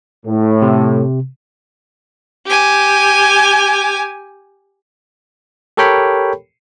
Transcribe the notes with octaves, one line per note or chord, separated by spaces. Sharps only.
A2
C3
G4 G#5
G4 A4 A#4 C#5 G5 B5